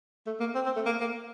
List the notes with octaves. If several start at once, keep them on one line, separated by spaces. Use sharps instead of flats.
A3
A#3
C4
C4
A3
A#3
A#3